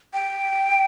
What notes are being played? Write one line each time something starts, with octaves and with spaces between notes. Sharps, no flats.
G5